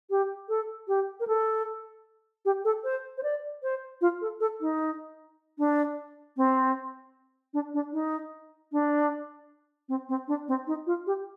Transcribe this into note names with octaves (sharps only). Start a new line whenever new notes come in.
G4
A4
G4
A#4
A4
G4
A4
C5
C5
D5
C5
F4
A4
A4
D#4
D4
C4
D4
D4
D#4
D4
C4
C4
D4
C4
D#4
F4
G4